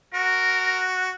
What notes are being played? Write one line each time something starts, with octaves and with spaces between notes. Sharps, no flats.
F#4 A#4